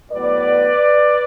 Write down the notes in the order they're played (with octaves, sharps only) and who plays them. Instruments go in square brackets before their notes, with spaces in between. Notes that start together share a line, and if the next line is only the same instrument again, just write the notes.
[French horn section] A2 F#3 B3 B4 D5